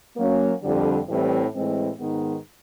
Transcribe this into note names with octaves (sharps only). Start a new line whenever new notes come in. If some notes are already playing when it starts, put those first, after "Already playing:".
F#3 A#3 C#4
F2 D3 G3
A2 E3 G3 C4
A2 E3 G#3 C4
G#2 D#3 G#3 B3 D#4